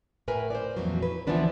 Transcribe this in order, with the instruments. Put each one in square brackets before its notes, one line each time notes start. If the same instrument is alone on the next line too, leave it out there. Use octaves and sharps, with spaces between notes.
[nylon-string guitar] A2 A#4 B4 G#5
C5 D5
F2 A#2 E3 F#3
B4
D2 E3 F3 B3 D4 B4